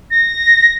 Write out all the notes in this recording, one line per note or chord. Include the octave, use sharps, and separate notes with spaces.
A#6